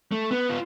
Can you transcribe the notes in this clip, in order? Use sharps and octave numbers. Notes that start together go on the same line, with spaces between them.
A3
B3
F4